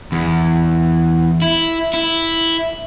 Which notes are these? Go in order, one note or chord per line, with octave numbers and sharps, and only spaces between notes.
E2
E4
E4